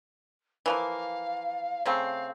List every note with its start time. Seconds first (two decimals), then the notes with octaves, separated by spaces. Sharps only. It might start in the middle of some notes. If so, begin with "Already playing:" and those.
0.66 E3 F3 A#3 F5
1.86 C#3 A3 C4 F5